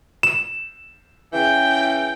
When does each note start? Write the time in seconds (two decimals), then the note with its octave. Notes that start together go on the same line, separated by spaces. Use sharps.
0.23 E7
1.33 C#3 E3 G5